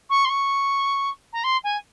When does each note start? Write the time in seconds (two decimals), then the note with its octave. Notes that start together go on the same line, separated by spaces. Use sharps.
0.09 C#6
0.24 C6
0.29 C#6
1.32 A#5
1.43 C6
1.63 G#5